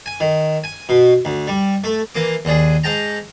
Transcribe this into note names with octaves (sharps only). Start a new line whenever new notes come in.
G#5
D#3
G#5
B2
D2
G3
A3
E3 A#3 D6
D#2 D4 G#4
G#2 G5 A5 A#5